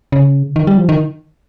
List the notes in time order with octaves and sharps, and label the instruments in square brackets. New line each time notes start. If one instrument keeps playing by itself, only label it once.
[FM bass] C#3
D#3
G3
F3
D#3